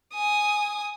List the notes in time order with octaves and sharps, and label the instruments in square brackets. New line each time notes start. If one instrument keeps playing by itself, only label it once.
[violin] G#5 D#6